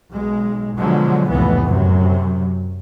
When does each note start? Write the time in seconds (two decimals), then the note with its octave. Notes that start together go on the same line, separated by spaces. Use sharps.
0.13 B1 G#3
0.77 B2 D3 F3 F#3 G#3
1.30 F1 C#2 A2 E3 B3
1.66 F#2 C3 F#3